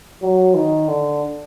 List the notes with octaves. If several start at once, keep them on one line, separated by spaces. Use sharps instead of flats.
F#3
D#3
D3